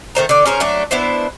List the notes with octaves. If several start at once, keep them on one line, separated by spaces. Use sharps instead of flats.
D#3 A3 C5 A#5
D3 D5
C#4 G#4 A#4 C5
F#3 A3 D4
B3 D4 E4 C5